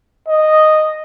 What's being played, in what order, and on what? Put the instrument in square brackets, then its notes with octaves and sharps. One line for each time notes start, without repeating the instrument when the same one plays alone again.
[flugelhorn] D#5